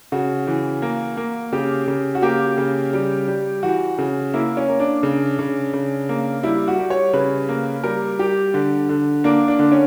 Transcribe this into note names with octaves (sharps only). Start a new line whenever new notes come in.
C#3 F#4
E3
A#3
A#3
C#3 G4
C#3
F#4
A#3 G4
C#3
G3
G3
E3 F#4
C#3
A#3 E4
C#4
A#3
D4
C#3
C#3
C#3
A#3
G3 E4
F#4
G3
C#5
C#3 B4
A#3
G3 A#4
G3 G4
D3
D3
A#3 D4
D4
D3
C#4